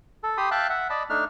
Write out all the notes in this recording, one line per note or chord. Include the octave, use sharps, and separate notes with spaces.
A4
G4 B5 C6 D#6
E5 F5 G5 A5 F#6
E5 F#5
D5 D#5 A5 B5
A3 D4 D#4 F6